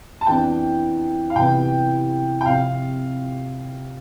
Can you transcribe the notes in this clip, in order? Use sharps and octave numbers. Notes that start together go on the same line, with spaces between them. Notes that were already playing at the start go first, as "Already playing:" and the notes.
A5
F2 E3 B3 D4 G5
F5
C2 C3 E3 B3 G5
G5
C3 F3 C4 F5